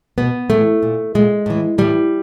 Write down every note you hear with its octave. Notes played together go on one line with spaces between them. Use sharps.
B2 B3
A2 E3 A3
A#2
A#2 G#3
A2 E3
A2 E3 G3